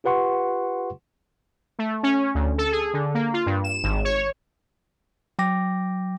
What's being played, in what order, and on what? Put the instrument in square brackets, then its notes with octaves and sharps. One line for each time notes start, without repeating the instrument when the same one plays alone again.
[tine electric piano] F4 G4 B4 F#5 C6 C#6
[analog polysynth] A3
C#4
D2
A4
G#4
D3
A#3
F4
G2
E7
G#1
C#5
[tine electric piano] F#3 G5 D6 A#6